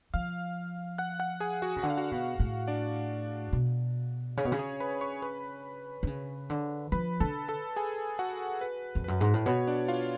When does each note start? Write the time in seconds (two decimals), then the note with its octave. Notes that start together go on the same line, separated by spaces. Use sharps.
0.14 F3 F5 F6
0.98 F#5 F#6
1.20 F#5 F#6
1.40 G#4 G#5
1.62 F#4 F#5
1.76 C#3
1.83 D3 F#5
1.90 F5
1.98 F#4 F#5
2.12 B2
2.40 A2
2.68 D4 D5
3.53 B2
4.37 C#3 C#5
4.45 B2
4.52 C#3
4.59 G#4 G#5
4.80 B4 B5
5.01 C#5 C#6
5.22 B4 B5
6.03 D3
6.07 C#3
6.50 D3
6.92 F3 B4 B5
7.20 D3 A4 A5
7.48 A4 A5
7.76 G#4 G#5
8.19 F#4 F#5
8.61 B4
8.95 F2
9.04 F#2 B4
9.21 G#2
9.34 A2
9.46 B2 C#5
9.67 D4 D5
9.88 F4 F5